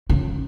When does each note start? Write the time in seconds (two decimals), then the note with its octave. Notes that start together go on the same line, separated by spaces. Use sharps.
0.09 C#3